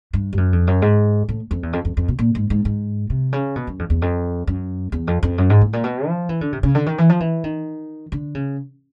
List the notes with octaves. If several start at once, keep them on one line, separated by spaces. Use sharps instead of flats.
G2
G2
F#2
F2
F#2
G#2
A2
F2
E2
F2
F2
F2
B2
A#2
G#2
G#2
G#2
C3
C#3
B2
F#2
F2
E2
F2
F#2
E2
F2
F2
F#2
G#2
A2
A#2
B2
F3
E3
D3
C3
C#3
D3
D#3
E3
F3
E3
D#3
D3
C#3